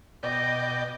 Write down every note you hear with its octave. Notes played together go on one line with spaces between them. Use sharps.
B2 D5 D#5 G5